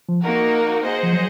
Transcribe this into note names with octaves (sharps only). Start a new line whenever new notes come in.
F3
A#3 D#4 F#4 A#4
G#4 C5 D#5 F#5
F3
F#3